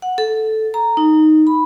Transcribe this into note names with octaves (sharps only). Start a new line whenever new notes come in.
F#5
A4
A#5
D#4
B5